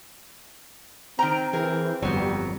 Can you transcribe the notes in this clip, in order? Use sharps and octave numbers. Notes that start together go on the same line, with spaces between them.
D#3 C4 G5 A#5
E3 G#4 A#4
G1 F2 F#3 G3 B3